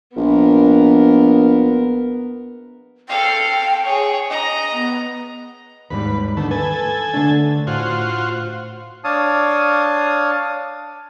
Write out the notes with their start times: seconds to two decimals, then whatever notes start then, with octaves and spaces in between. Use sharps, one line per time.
0.16 A#1 B3 A#4
3.09 A4 F5 G5
3.85 G#4 C#5
4.29 D#5 A#5
4.73 B3
5.90 D#2 G#2 G3 B4
6.37 D3 D#3 A3
6.51 A4 B4 G#5
7.14 D3 A3 D4
7.67 A2 F4 F#4 C5
9.04 D4 C#5 F5 A5 D#6